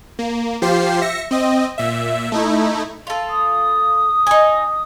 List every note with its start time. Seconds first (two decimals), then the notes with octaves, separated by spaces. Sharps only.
0.19 A#3
0.62 F3 F4 G4 C5 C7
1.01 E5 A#6 C#7
1.31 C4 D#5
1.78 A#2 E5
2.32 A3 D#4 E4
3.07 F4 A4
3.30 D#6
4.27 D#4 G#5